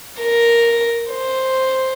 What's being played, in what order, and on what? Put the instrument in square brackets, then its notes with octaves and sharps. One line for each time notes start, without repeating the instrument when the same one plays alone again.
[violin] A#4
C5